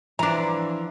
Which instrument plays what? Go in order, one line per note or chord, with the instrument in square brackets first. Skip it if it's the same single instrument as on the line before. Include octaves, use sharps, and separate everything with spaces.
[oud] E3 F3 [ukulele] D4 A#5